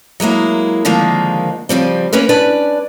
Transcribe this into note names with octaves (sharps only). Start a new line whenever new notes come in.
F#3 G#3 A#3 E4
D3 D#3 F3 G#3 A#3 C4
C#3 F3 G3 C4
A#3 C#4 A#4 B4
C#4 D4 B4 D5